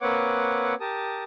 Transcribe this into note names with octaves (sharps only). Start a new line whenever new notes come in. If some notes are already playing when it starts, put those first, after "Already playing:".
A#3 C4 B4 C#5 F#5 D6
G4 A#4 A5 D#6